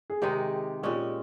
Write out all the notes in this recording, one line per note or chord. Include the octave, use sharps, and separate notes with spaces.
G#4
C3 D#3 G#3 D#4 G4
A#2 G#3 C#4 G4